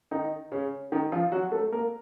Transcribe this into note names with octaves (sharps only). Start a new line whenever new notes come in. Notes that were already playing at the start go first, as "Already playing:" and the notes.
D#3 D#4
C#3 C#4
D#3 D#4
F3 F4
F#3 F#4
A3 A4
A#3 A#4